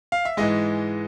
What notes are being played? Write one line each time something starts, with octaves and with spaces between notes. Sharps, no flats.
F5
E5
G#2 E3 G#3 D#5